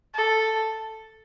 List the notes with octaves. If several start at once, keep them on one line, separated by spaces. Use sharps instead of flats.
A4